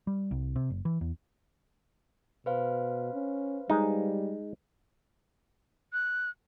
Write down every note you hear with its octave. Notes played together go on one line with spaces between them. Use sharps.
G3
C2
C3
F#1
E3
E2
B2 B4 C5 F5
C#4
G3 G#3 D#4
F#6